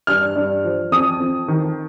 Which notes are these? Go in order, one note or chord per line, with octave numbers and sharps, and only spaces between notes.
G2 F6
G2
F3
F2 D#6
F2
D#3